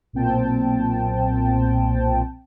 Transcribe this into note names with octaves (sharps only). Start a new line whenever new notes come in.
B1 A#2 C4 G5 A5